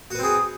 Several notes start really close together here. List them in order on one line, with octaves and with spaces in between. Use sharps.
F#4 B4 C4 G#4